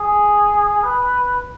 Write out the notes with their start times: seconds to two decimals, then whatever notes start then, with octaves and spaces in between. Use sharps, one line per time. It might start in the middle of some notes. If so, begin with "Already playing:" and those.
Already playing: G#4
0.83 B4